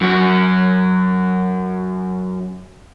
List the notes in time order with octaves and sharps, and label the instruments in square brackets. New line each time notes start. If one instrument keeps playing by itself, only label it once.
[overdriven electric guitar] F#2 F#4